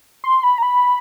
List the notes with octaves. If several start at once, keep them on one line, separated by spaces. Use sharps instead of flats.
C6
B5
A#5
B5